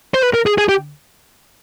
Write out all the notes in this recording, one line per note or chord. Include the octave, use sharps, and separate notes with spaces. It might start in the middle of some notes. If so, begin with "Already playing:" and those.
C5
B4
A#4
G#4
G#4
G4